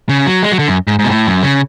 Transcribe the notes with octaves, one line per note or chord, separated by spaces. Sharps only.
C#3
F#3
G#3
F#3
D3
F#2
G#2
G#2
B2
A2
F#2
C#3